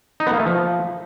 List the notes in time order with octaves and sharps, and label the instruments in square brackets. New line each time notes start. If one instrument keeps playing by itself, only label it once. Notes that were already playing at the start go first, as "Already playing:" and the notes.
[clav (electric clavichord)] D#4
B3
A#3
A3
F3